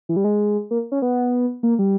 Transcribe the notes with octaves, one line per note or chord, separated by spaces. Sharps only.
E3
G3
G#3
A#3
C#4
B3
A#3
G3